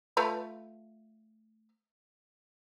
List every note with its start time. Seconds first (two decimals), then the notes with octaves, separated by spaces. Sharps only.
0.17 A3 F4 B4